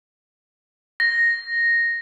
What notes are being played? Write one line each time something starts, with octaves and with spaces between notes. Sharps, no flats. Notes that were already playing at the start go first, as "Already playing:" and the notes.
A#6